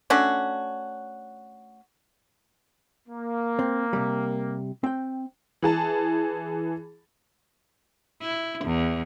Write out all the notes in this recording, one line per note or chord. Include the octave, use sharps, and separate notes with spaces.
A3 C#4 D4 F#4
A#3
C4
C3 G3
C4 G5
E3 G#4 A5
E4
E2